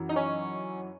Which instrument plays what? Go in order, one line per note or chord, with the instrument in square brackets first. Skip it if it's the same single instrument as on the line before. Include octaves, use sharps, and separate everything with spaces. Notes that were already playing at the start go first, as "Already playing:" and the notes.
Already playing: [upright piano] F#2 E3 E4
[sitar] D#4
C#4